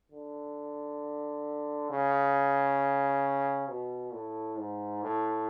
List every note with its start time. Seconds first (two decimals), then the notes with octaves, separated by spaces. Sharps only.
0.11 D3
1.90 C#3
3.69 B2
4.14 A2
4.58 G#2
5.03 A2